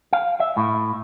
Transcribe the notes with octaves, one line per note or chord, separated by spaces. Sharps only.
F5
E5
A2